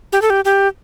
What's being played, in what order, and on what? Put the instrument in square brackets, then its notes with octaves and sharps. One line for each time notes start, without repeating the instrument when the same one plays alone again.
[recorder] G4
A4
G4
G4